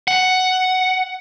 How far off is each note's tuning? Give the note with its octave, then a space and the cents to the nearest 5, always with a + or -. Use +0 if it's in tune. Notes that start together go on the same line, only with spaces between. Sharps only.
F#5 +5